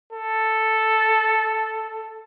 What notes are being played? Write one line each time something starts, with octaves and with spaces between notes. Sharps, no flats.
A4